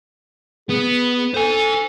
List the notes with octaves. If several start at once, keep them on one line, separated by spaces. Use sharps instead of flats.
B3 G#4
A4 C5 G#5